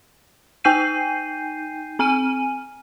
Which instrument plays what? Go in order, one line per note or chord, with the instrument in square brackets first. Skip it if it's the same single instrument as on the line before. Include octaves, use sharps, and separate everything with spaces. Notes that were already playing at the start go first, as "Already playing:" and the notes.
[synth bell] D#4 G5 G#5 G6 C7 D#7
C4 G#5 F6 D#7